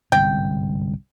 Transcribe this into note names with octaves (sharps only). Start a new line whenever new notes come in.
G1 C2 G#2 G5